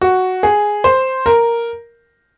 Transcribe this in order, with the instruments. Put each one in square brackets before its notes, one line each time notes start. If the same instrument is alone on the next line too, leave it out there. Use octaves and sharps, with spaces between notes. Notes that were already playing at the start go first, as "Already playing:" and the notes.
[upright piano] F#4
G#4
C5
A#4